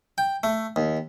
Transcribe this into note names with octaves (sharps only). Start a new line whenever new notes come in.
G5
A3
D#2